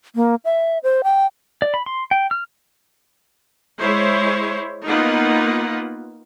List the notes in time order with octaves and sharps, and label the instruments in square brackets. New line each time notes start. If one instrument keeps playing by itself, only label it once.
[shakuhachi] A#3
E5
C5
G5
[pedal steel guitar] D5
B5
C6
G5
F6
[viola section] G#3 E4 C5 C#5
A#3 B3 D#4 F4 F#5